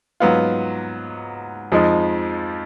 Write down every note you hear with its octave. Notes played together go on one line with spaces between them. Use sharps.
G#2 F#3 B3 F4
F2 F3 G#3 D#4